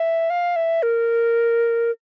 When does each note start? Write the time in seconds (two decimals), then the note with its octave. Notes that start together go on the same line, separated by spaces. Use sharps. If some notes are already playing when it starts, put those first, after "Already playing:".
Already playing: E5
0.30 F5
0.56 E5
0.83 A#4